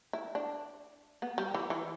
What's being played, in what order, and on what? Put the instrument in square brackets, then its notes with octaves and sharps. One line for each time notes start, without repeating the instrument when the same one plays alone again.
[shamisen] E4
D4
B3
G3
E3
E3